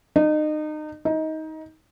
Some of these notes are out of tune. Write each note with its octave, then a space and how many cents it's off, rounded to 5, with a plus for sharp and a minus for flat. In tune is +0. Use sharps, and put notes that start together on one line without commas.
D#4 -30
D#4 +20